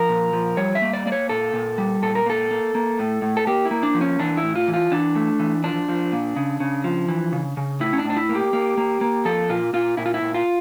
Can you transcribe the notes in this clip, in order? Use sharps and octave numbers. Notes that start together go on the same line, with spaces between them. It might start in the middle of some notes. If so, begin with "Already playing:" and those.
Already playing: F3 A#4
A#2
F3
G3 C#5
E5
A#3
D5
A#3 D5
C#5
A#2 A4
A#2
G3
A#2 A4
A#4
A#3 A4
A#3
A#3
A2
A2
A4
A#3 G4
E4
A#3
D4
F3
C#4
E3 D4
E4
A2
F4
E3
F4
E3 D4
A3
E3
F3 D4
F3
A#2
C#3
C#3
F3
E3
C#3
C#3
A2 E4
C#4
D4
A2
D4
E4
A#3
G4
A#3
A#3
A#3
F3 A4
A#2 F4
A#2 F4
A#2 E4
F4
E4
A#2
F4